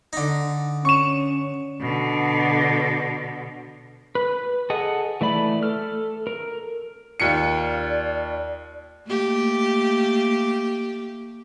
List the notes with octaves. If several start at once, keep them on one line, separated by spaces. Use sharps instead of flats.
D3 D#4
C#4 C#6 E7
B2 D3
B4
G#4 A4 D#5 F#5
E3 A3 D5 B5
A4 F6
A#4
D#2 F4 D5 C#7
A3 A#3 G4